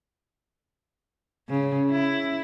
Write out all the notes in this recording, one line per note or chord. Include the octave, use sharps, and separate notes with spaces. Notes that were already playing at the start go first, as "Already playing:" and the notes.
C#3
E4